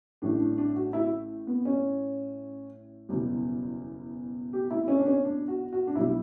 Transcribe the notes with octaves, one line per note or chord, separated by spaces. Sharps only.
A1 A2 G3 D4
D4
D4
F#4
E4
B3
C#4
F#1 E2 B2 G3
G4
E4
C#4
D4
C#4
D4
F#4
F#4
D4
B1 B2 G3 E4